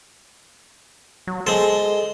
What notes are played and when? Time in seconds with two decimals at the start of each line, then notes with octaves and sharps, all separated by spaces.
1.27 F#3
1.47 G#3 A4 C5